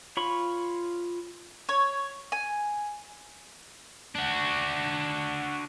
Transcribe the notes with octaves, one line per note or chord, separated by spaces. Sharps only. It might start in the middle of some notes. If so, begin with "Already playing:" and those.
F4 C#5 B5 C#6
C#5
G#5
D4 F#4